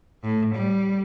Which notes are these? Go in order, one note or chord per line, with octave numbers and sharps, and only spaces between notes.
A2
G3